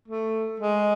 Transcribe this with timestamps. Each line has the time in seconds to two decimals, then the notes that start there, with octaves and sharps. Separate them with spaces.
0.08 A3
0.60 G#3